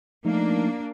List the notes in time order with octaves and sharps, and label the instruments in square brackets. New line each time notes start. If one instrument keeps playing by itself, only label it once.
[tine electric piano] F3 A3 D#4 [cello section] A#3 D4